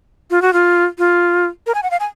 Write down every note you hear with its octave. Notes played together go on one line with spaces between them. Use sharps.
F4
F#4
F4
F4
A#4
G#5
F#5
F5
G#5